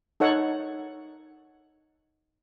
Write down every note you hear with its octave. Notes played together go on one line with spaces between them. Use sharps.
D#4 A4 C#5 F#5